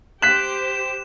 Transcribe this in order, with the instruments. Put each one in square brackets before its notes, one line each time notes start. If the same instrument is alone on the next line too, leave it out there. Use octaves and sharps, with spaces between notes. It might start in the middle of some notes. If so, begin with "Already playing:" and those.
[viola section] G4 C5 [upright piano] F#6 B6 [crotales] E7